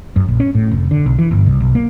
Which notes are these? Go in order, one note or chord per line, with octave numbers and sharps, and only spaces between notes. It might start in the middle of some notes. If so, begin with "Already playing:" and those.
F#2
A#1
C#4
A2
F1
D3
B1
E3
G1
C2
B1
A#3